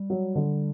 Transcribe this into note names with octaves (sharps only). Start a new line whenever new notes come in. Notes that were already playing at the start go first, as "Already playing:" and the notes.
Already playing: G3
F#3
D3